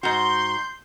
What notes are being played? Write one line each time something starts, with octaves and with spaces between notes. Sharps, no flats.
G#2 F#4 C6 G6